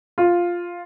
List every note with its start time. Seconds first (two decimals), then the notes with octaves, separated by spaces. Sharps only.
0.18 F4